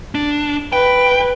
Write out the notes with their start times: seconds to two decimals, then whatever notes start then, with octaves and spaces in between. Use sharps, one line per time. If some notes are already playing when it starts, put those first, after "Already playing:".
0.15 D4
0.72 B4 G5